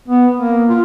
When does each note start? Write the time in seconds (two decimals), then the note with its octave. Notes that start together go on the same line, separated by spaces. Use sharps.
0.08 B3
0.37 A#3
0.70 F4